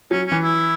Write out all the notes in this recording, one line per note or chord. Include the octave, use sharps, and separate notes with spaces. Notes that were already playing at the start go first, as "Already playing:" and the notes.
F#3 C#4
E3 C#4
E4